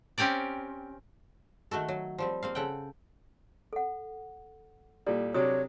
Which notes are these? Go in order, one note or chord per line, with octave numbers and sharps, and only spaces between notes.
C4 C#4 G4 A#4 D5
D#3 A3 F#4 A4
F#3
F3 G3 C4
A#3 C4 F5
C#3 A4 F#5 G5
A4 F#5
A#2 G3 E4 A4 D5
C3 F#3 D4 C#5 D#6